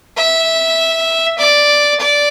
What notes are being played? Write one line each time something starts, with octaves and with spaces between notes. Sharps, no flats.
E5
D5
D5